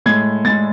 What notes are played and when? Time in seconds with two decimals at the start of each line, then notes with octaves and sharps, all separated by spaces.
0.06 A2 G#3 G#6
0.44 A2 G#3 A6